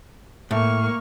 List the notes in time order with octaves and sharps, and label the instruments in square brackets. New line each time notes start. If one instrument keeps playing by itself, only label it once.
[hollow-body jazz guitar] A2 [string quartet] A#3 C#6 F6